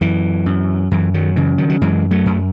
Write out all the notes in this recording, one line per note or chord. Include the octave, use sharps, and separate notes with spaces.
F#2 E3
F#2
F#2 E3
D#3 F#3
C#3 E3
D#3 F#3
F#3
F#2 E3 G#3
F#3 A3
F#2